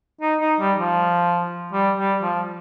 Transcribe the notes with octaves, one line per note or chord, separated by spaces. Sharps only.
D#4
D#4
G3
F3
G3
G3
F3